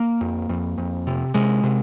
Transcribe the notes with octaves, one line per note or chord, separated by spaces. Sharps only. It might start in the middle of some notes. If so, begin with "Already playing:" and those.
Already playing: A#3
F2
F2
F2
C3
C3 G#3
C3